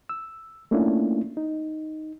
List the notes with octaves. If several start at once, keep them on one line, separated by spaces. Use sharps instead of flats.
E6
A3 A#3 C#4 D4 E4 F4
D#4